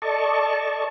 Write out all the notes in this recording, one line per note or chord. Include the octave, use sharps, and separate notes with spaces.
A4 D5 D#5 A5 C#6